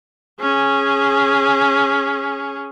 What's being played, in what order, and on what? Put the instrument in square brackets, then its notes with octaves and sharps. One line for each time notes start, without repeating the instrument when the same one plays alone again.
[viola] C#4 G#4